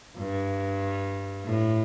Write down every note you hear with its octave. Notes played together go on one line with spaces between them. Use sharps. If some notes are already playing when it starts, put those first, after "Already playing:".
G2
A2